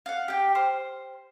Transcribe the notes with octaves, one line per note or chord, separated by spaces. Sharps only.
F5 F#5
G4 G5
C5 F6